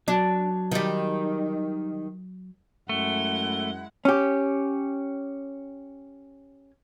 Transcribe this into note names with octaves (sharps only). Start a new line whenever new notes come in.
F#3 D4
D#3 G3
F#2 G#3 A3 E4 F#5 G7
C#4 G4